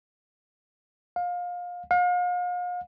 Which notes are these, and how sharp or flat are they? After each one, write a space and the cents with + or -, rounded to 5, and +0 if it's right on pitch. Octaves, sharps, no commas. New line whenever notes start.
F5 +25
F5 +40